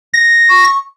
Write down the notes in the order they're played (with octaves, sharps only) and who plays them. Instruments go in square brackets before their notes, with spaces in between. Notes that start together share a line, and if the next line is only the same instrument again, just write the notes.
[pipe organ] A#6
[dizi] C#6